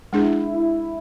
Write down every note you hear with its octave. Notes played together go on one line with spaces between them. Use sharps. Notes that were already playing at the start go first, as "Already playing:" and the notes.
G#3 D4 E4 G#4